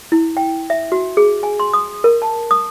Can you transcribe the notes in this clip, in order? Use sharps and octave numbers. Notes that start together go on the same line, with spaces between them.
E4
G5
E5
F#4
G#4
G#5
C6
D#6
A#4
A5
D#6